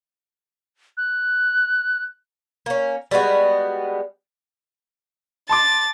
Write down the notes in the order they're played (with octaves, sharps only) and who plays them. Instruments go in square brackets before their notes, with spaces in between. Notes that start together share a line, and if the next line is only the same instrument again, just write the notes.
[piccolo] F#6
[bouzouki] A#3 C#4
G3 G#3 B3 F#4
[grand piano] A5 C6 D6 [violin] A6